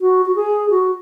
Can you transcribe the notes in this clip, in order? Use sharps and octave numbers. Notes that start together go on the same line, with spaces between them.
F#4
F#4
G#4
F#4